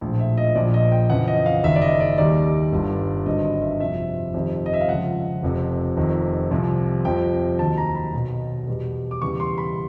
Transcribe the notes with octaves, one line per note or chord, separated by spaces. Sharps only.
A#1 A2 F3
E5
D#5
A#1 A#2 F3 D5
D#5
G5
F2 C#3 E3 F#5
D#5
F5
F#1 F#2 D#3 E5
D5
D#5
D5
D#2 D#3 G3 D5
G1 G2 D3 G3
G#1 G2 D3 F#3 D#5
D#5
E5
F2 C3 F3 E5
F2 C3 D#3 G3
D#5
E5
F5
C#2 C#3 F3 F#5
F1 F2 C3
F1 F2 C3 D#3
C2 C3 F3
F2 C3 F3 G5
D#2 D#3 F#3 A5
A#5
B5
B1 B2 F#3
E2 B2 G3
D6
E2 C#3 E3 G3 C#6
C6
B5